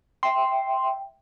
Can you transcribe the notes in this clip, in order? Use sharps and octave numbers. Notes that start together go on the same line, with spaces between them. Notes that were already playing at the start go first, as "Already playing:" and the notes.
E5 G5 C6